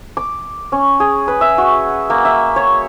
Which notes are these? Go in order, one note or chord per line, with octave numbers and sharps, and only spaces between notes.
D6
C#4
G#4
B4
E5
F#4
A#3
E5
C#5